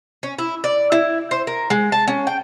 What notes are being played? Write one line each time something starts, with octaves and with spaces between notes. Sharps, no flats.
C#4
E4
D5
E4
C5
A#4
G#3
A5
C#4
G5